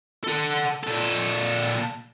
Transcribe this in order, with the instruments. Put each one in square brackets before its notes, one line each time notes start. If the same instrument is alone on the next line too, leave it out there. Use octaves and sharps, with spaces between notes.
[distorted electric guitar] A4 F#5
A#2 A4